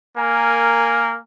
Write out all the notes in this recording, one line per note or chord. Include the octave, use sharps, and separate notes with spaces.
A#3 A#4 G#5